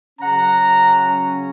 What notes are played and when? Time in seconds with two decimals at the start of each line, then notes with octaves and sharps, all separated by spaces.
0.19 C#3 F#3 C#4 F#5 A#5